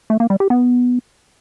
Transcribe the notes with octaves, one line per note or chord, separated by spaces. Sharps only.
A3
A#3
G3
G4
B3